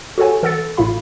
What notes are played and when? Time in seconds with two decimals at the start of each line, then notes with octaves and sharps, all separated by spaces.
0.18 F#4 G4 A4 C#5 F#5 G#5
0.43 E3 A4 F#5 E6 A6 C#7
0.77 A1 A2 E4 F4 F5 B5